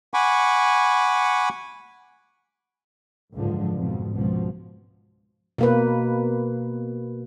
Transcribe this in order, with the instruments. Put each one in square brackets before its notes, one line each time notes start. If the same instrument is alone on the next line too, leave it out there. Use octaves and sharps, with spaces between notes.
[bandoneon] F#5 G#5 B5 C#6 D6
[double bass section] F#1 C#2 G#2 D3 F3
F2 G#2 B2
G#1 C#2 B2 F3
[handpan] B2 A#3 B4